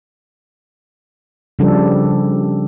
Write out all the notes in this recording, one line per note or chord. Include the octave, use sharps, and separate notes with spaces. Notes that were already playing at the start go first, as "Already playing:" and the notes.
C#3 F3 G3 D4 A4